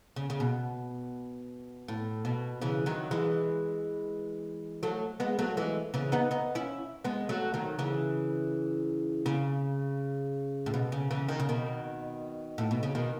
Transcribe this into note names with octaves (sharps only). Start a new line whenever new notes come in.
C#3
C#3
B2
A2
B2
C#3 E3
D#3 F#3
E3 G#3
F#3 A3
G#3 B3
F#3 A3
E3 G#3
C#3 E3
B3 D#4
B3 D#4
C#4 E4
G#3 B3
F#3 A3
D#3 F#3
C#3 E3
C#3
A2
B2
C#3
C#3 E3
D#3
C#3
B2 D#3
A2
B2
C#3
B2 D#3